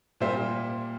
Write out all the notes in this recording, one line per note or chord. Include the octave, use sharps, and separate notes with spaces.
A#2 G3 A#3 C5 E5